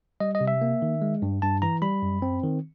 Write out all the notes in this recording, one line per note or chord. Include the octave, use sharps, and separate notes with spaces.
G3 D#5
D#5
C3
E5
A#3
D#3
G#3
G2
G2 A5
E3 A#5
G3 B5
F#2
C4
D#3